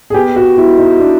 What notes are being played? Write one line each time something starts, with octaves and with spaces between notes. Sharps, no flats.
G#4
B3 G4
F#4
B3 E4
D#4
B3 D4